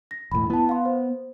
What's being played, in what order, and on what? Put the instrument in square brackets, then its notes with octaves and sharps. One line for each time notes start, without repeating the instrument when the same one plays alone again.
[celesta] A#6
[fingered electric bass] E1 A2 [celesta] B5
[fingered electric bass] B3 [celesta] E4 A5
[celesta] F5 C6
C5